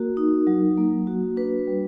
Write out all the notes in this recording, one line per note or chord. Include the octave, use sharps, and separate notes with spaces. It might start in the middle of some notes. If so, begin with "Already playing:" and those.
Already playing: A#3 F#4 A#4
D#4
F#3
A#3
F#4
D4 B4
G3